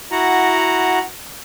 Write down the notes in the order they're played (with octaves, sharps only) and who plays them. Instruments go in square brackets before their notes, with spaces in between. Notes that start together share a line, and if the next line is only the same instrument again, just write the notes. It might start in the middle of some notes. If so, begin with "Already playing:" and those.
[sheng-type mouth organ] E4 F#4 F#5 A#5